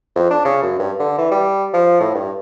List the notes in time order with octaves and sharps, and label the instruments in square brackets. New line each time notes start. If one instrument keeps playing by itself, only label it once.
[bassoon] F2
D4
C#3
F#2
G2
D3
E3
G3
F3
A2
G2